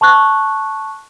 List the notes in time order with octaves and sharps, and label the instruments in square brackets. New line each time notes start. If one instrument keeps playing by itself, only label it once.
[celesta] A5 C#6 F#6